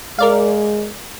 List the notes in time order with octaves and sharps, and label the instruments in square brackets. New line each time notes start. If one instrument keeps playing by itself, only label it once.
[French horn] G#3 [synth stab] A#4 D5 F5